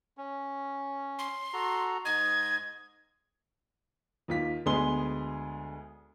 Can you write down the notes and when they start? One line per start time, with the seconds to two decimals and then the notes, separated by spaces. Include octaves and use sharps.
0.18 C#4
1.19 C6
1.54 F#4 A4 A#5
2.05 G#2 D#5 G#6
4.28 D#2 F4 B6
4.66 D2 G#3 B3 G#4 C6 G7